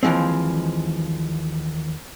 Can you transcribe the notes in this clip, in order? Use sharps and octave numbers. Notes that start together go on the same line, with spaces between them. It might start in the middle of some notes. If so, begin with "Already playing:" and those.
D#2 E3 F3 G#3 C4